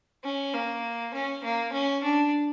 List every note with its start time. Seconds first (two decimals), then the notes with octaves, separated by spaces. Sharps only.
0.24 C#4
0.54 A#3
1.14 C#4
1.44 A#3
1.73 C#4
2.04 D4